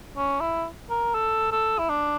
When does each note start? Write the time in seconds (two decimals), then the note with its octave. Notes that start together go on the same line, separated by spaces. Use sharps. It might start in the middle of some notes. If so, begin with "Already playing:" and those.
0.17 C#4
0.40 E4
0.90 A#4
1.14 A4
1.52 A4
1.79 E4
1.89 D4